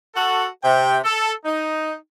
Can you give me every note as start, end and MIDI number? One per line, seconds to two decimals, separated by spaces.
0.15 0.45 66
0.15 0.45 69
0.63 0.96 48
0.63 0.96 79
1.03 1.32 69
1.45 1.93 63